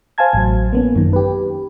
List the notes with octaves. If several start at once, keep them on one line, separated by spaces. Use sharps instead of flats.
C5 F5 G#5 A5 G#6
A1 F#3
A#3 B3 C#4
F#2 D#3
G4 B4